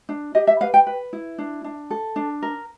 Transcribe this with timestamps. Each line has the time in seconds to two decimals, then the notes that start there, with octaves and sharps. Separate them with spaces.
0.09 D4
0.35 G4 D#5
0.47 E5
0.61 B4 F5
0.74 G5
0.87 B4
1.13 E4
1.38 D4
1.64 D4
1.91 A4
2.16 D4
2.43 A#4